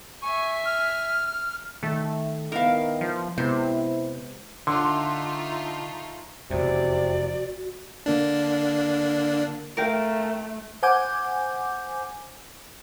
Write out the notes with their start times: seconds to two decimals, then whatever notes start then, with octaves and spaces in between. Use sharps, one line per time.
0.22 E5 G#5 C#6
0.65 F6
1.83 D#3 A3 A4
2.52 D#3 B3 E4 A#4 F5
3.01 F3
3.38 C3 G#3 B3 E4 C5
4.67 D3 A3 D#4 F4 C6
6.50 F1 E2 C3 F#4 D5
8.06 D3 A#3 D4
9.77 A3 A#4 F5 G5
10.83 C5 F#5 G#5 D6 G6